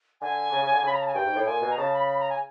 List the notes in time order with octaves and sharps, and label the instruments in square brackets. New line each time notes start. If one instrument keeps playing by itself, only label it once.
[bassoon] D3 [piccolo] G#5
[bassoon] C#3
C#3
D3
[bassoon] C#3 [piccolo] B5
[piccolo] A#5
A5
G#5
[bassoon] G2 [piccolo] G5
[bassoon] G#2
A2
[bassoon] A#2 [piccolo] G#5
[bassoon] B2
[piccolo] A#5
[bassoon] C#3 [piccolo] A5
[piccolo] B5
B5
A#5
G#5